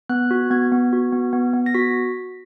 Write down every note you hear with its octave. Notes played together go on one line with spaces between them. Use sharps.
B3 F#6
F#4
B3 G#6
B3
F#4
B3
B3
B3
A#6
F#4 B6